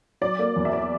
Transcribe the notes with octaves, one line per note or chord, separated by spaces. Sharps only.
F#3 D5
A#3
E2
E5
D5